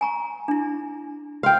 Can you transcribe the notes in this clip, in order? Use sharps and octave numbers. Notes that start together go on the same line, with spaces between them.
G#5 A#5 C#6
D4 E4
F#4 F5 G5 C6